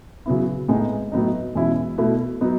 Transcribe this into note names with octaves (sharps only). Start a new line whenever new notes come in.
C#3 F#3 B3 E4
A2 G#3 B3 D#4
A2 F#3 B3 D#4
E2 B2 G#3 C#4 E4
B2 A3 E4
F#3 B3 D#4